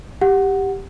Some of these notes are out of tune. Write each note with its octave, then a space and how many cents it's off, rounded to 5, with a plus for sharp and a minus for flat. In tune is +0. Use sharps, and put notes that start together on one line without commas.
G4 +0 F#5 +0